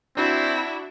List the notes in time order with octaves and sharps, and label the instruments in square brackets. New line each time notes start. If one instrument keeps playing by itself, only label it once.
[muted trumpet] C4 [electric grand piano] D4 F#4 D5 [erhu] E4